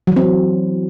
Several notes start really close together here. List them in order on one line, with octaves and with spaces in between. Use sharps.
F#3 E3 C4